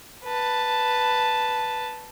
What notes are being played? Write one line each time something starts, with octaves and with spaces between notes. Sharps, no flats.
B4 A5